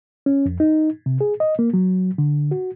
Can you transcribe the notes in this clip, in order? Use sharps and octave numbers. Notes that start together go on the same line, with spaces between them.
C#4
F2
D#4
C3
G#4
D#5
A#3
F#3
D3
F#4